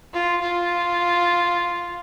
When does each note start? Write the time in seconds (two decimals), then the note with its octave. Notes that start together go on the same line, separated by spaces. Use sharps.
0.13 F4
0.42 F4